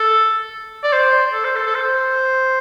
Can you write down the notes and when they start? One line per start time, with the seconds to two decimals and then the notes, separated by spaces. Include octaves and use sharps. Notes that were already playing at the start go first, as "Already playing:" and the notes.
Already playing: A4
0.84 D5
0.93 C5
1.33 A4
1.44 C5
1.56 A4
1.66 A4
1.75 C5